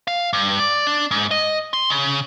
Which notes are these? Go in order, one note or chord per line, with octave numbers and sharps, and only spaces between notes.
F5
G2
D5
D4
G#2
D#5
C6
C#3